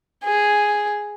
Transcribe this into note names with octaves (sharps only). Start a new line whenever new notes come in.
G#4